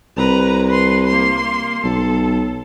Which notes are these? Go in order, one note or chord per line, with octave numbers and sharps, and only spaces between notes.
C2 B4 A#5
B4 C6
A#3 C6
B1 A4